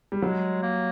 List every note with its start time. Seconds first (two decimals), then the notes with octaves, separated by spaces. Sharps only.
0.12 G3
0.22 F#3 G#3
0.63 A#3